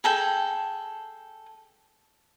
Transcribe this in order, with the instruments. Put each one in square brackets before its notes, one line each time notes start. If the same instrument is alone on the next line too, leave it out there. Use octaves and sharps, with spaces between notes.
[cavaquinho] G#4 A4 G5